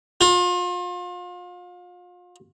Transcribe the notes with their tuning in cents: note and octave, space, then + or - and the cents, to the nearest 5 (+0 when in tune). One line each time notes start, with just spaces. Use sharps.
F4 +35